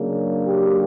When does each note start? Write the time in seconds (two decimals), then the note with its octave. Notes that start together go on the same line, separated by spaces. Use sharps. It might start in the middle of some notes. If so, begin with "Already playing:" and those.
Already playing: C#3 F#3 A#3 D4
0.47 G4